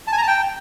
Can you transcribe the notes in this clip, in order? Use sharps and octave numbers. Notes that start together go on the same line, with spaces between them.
A5
G#5
A#5
A5
G5